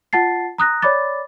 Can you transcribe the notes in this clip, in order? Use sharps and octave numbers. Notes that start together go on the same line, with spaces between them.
F4 F#5 A5 A6 C7
A#5 D#6 F#6 A#6
C#5 D5 B5 D6 A6